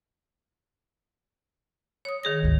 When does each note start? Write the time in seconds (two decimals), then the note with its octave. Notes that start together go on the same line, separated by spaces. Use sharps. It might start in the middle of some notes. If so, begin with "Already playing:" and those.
2.05 C#5 D#6
2.23 D#3 G#4 A#6
2.43 D2 G#2